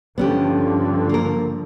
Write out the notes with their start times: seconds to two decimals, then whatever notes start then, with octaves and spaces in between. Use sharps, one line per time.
0.18 G2 D3 F3 B3 C#4 G4
1.09 A#3 A#4